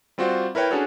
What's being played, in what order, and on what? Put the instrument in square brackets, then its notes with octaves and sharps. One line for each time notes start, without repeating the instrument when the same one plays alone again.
[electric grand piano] G3 C4 F4 F#4 C5 D5
E4 A#4 B4 C#5 G5
C#4 D4 F#4 G#4 A4 C#5